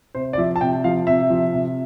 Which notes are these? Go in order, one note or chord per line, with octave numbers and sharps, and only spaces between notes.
C3 C5
D5
F3 E5
A5
C3 G5
F3 F5
C3 E5
F3
C3